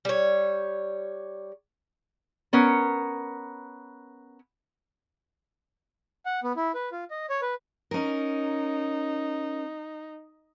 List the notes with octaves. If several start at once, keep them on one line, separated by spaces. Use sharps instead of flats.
G3 C#5
B3 C#4 A#4
F#5
B3
E4
B4
F4
D#5
C#5
B4
C#4 D#4 A#4